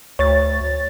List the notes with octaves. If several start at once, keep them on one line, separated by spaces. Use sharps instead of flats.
D2 C#5 A6